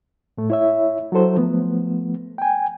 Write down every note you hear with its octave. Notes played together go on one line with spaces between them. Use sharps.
A2 A3
E4 C#5 E5
F#3 E4 A4 C5
F3 A3 B3
G5 G#5